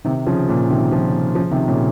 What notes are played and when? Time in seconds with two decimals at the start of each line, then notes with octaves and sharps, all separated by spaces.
0.05 C3 D#3
0.26 C#3 F3
0.49 A#2 C#3
0.70 C3 D#3
0.92 C#3 F3
1.35 C#3 F3
1.51 C3 D#3
1.68 A#2 C#3